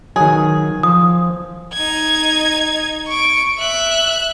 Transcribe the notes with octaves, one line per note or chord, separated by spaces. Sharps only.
D#3 F#3 G#4
F3 D#6
D#4 G#6
C#6 D7
E5 F#6